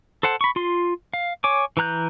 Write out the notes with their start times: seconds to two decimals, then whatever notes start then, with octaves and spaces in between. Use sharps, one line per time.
0.23 A4 C5 F#5 A5
0.41 B5 C#6
0.56 F4 C6
1.13 F5
1.44 C#5 G#5 D6
1.77 E3 B4 A#5 F#6 G6